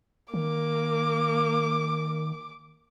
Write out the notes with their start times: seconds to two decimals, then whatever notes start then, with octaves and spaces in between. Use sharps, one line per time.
0.34 D#3 A#3 D6